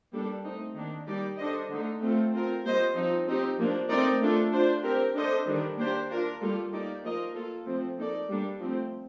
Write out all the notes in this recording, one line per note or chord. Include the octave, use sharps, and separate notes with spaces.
G3 A#3 D4 A4
A3 C4 D#4
D#3 A#3 D4
G3 A#3 D#4 G4 D5
D4 A4 C5 D#5
D3 A3 D#4
A3 C4 F4 A4
C4 F4 A#4
G3 A#3 F4 C5 D#5
F3 C4 D#4
C4 D#4 G4
F3 A#3 D4
A3 C4 D#4 A#4 D5
A3 D4 F4 A4
D4 F4 C5
C4 G4 A#4
D4 A4 C5 D#5
D#3 G3 D4
A#3 D4 G4 C5
D4 F4 A#4
G3 A#3 F4 A4
A#3 D#4 G4 D5
F3 A#3 F4 A#4 D#5
A#3 F4 A4
F3 A3 C4
A#3 D#4 A4 D5
G3 A#3 D4 A4
F3 A3 C4